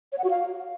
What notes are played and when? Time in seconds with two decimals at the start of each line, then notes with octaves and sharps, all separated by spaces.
0.12 C#5
0.18 F#5
0.24 F#4
0.30 F5